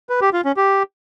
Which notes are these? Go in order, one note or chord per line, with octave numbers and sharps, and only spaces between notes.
B4
G4
F4
C#4
G4